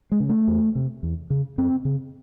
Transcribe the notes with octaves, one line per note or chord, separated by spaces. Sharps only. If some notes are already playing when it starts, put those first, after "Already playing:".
G#3
C#3
A3
E2
C3
E2
C#3
F#2 C4
C#3